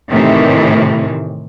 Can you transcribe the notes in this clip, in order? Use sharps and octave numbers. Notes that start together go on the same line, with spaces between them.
A2 C3 D#3 E3